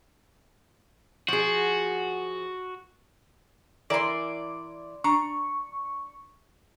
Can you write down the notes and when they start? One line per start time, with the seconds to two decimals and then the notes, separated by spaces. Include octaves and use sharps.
1.28 F3 F#4 G#4
3.90 E3 E4 A#4 D5 C6
5.04 D4 A#5 C#6